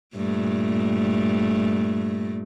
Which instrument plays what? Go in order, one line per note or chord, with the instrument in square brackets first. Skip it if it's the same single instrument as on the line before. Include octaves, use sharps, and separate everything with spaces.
[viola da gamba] G2 A#2 A3